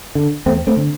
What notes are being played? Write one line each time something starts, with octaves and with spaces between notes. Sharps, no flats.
D3
E2 A3 C4
A3 C4
D3